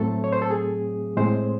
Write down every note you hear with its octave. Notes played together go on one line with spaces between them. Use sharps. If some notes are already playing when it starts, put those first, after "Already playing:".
Already playing: A2 F#3 A3 C4 A4
C#5
C5
A4
G#4
A2 G#3 C4 C5